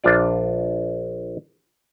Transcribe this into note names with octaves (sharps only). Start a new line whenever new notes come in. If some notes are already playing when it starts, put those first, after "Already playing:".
A#1 D4 F4 D5